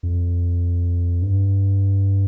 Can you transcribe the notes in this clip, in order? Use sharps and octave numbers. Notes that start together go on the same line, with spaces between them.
F2
G2